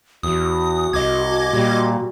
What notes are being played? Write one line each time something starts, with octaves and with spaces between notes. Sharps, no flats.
E2 F#4 D#6
C2 D#5 D6 G#6
A#2 G3